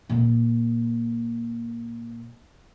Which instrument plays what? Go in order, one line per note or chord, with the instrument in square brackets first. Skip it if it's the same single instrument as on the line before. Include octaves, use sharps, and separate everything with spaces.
[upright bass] A#2